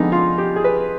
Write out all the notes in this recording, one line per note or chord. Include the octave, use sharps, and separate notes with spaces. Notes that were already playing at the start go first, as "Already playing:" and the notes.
Already playing: F2 D3 G#3 B3 D#4
F4
G4
G#4
B4